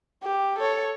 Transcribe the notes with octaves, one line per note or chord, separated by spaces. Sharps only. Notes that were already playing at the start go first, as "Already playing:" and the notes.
G4
A4 C#5